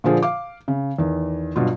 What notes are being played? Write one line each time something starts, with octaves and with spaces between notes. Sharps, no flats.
A#2 D3 F3 G#4
F5 D6
C#3
E2 D#3
G2 B2 F#3 F4